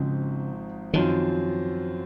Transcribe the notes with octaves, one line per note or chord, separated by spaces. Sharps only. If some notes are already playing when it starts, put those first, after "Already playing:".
Already playing: G#1 G#2 C#3 F3 C4 D#4
F#2 D#3 F3 C4 F4